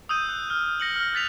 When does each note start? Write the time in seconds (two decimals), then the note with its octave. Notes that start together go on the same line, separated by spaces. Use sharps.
0.09 D#6 E6 G6 D#7
0.29 F#6
0.50 F6
0.80 A#6 C#7 F#7
0.96 F6
1.14 F#6 A6 B6 F7